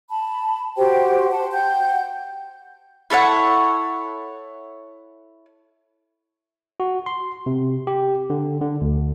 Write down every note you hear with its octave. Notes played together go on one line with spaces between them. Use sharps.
A5 B5
F#4 G4 C5 G5
F#5 A5 C6
F#5 G5 G6
E4 A4 C#5 F#5
F#4
C6
C3
G4
D3
D3
D2